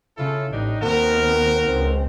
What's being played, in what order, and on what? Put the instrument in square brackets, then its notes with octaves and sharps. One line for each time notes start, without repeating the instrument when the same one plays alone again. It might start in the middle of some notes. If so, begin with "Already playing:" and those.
[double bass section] C#3 [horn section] E4 F4 A4
[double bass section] A1 [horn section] G3 D4 D#4
[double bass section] D#2 B3 C4 [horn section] D#4 F#4 A#4
[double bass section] C#2 C4